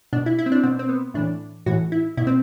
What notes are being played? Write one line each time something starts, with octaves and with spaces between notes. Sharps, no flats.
B2 D4
E4
E4
C4
D4
B2 C4
C4
B3
A2 E3 D4
A2 E3 F#4
E4
B2 E4
C4